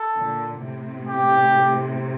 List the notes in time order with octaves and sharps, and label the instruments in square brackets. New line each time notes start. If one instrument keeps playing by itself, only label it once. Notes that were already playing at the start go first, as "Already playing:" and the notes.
Already playing: [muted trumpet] A4
[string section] A#2 D3
A2 C3
[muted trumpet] G4